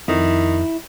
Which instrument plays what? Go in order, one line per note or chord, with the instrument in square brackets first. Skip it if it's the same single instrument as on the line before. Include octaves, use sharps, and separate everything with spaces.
[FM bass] F2 [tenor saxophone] D#3 [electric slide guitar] E4